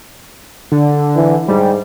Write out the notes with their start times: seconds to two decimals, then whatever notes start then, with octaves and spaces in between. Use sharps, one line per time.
0.72 D3
1.16 E3
1.48 G#2 G3